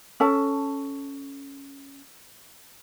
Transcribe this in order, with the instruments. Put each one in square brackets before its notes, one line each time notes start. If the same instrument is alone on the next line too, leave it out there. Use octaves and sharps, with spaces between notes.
[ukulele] C#4 A4 A5